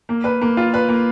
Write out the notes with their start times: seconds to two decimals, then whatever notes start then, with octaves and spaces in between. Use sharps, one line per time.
0.09 A#3
0.24 B4
0.41 A#3
0.57 F4
0.74 B4
0.89 A#3